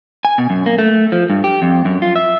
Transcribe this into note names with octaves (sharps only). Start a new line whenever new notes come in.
G#5
B2
F#2
A#3
A3
F3
G2
G4
F2
F#2
F4
E5